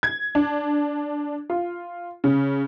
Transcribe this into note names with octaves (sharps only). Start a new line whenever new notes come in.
G#6
D4
F4
C#3